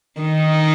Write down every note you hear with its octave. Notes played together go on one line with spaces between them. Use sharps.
D#3 D#4